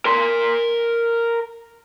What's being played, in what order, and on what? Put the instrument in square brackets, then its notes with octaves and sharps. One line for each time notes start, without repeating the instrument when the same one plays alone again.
[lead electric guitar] A#4 C6